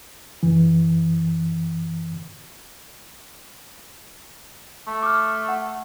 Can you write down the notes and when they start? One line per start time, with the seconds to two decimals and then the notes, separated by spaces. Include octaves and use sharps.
0.43 F#2 E3
4.88 A3
5.03 D6 F6
5.48 F#5